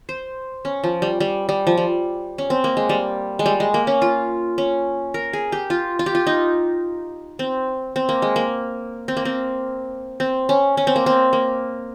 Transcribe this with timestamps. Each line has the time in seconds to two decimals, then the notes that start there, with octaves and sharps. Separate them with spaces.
0.09 C5
0.65 C#4
0.84 F3
1.02 G3
1.20 G3
1.49 G3
1.67 F3
1.77 G3
2.38 C#4
2.50 C4
2.64 A#3
2.77 G#3
2.89 G3
3.39 G#3
3.46 G3
3.60 G#3
3.74 A#3
3.87 C#4
4.02 F4
4.58 C#4
5.14 A#4
5.33 G#4
5.52 G4
5.70 F4
5.99 F4
6.06 G4
6.15 F4
6.27 D#4
7.39 C4
7.96 C4
8.09 A#3
8.22 G#3
8.36 A#3
9.08 C4
9.17 A#3
9.25 C4
10.20 C4
10.49 C#4
10.77 C#4
10.87 C4
10.96 A#3
11.06 C4
11.33 A#3